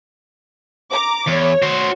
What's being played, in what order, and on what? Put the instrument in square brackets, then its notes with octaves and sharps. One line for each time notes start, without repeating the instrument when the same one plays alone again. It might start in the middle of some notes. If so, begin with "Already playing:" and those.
[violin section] A#5 D6
[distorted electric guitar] E2 [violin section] C#5
[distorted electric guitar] F#4 C5